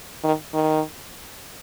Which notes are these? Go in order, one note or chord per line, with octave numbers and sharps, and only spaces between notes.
D#3
D#3